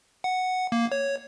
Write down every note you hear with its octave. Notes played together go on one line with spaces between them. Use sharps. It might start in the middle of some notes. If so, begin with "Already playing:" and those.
F#5
A#3
C#5